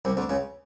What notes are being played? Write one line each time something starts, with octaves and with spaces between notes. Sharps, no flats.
C2 C3
D2 D3
C#2 C#3